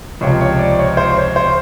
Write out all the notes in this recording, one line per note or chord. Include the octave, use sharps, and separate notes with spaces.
C#2 C3 F3 C#5
C#5
D5
C#5
C5
C#5
C5